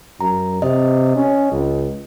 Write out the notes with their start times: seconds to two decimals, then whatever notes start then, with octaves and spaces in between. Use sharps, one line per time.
0.21 F#2 A#5
0.62 C3 D#5
1.16 C#4
1.52 C#2